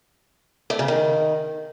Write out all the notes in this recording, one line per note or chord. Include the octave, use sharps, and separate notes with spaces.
A3
C#3
D#3